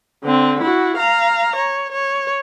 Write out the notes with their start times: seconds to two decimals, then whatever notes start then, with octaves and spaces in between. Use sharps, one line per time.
0.24 D3 C4
0.62 E4 F#4
0.97 F5 A#5
1.56 C#5
1.92 C#5